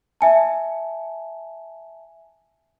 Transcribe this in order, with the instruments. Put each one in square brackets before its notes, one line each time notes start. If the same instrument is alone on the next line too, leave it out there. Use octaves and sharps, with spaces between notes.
[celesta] E5 G#5 A5